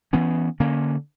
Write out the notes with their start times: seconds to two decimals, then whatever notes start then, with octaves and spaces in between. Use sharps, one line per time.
0.13 E3 B3 C#4
0.60 D3 A#3 C#4